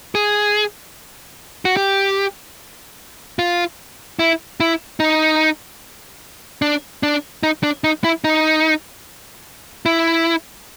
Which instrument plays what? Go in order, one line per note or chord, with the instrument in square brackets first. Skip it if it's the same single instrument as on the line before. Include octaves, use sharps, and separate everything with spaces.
[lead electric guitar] G#4
F#4
G4
F4
E4
E4
D#4
D4
D4
D#4
D4
D#4
E4
D#4
E4